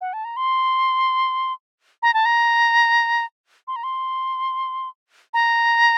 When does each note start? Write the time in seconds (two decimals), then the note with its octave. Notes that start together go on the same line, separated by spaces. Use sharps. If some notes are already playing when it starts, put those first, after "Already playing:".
0.01 F#5
0.13 A5
0.25 A#5
0.37 C6
2.02 A#5
2.14 A5
2.25 A#5
3.67 C6
3.76 A#5
3.83 C6
5.34 A#5